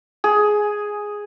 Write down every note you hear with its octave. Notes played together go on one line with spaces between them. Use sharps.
G#4